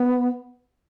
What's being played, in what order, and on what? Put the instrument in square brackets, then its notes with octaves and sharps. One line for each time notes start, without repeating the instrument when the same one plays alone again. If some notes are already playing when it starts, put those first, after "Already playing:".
Already playing: [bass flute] B3